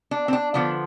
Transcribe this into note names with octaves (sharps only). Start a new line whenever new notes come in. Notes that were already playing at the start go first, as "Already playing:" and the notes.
D4
C4
D4
D3 F3 B3 D4